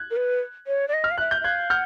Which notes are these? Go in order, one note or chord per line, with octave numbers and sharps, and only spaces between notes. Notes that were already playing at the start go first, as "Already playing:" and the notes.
Already playing: F#6 G#6
A#4
B4
C#5
D5
D#5
F6
F5
E5 F#6
G6
E5
F5 F#6 G#6
F#5 F6 G6